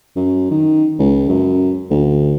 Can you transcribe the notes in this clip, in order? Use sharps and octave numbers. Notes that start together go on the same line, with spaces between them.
F#2
D#3
C#2
F#2
D2